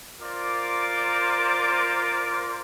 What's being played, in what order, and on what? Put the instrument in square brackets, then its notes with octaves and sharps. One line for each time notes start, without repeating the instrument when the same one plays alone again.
[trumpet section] F4 A#4 C5 D5 D6